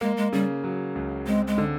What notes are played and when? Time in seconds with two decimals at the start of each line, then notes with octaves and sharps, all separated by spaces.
0.01 G#3 A#3
0.17 G#3
0.33 C#3 G3
0.64 F#3
0.95 C#2
1.26 G#3 C4
1.47 G#3
1.58 D3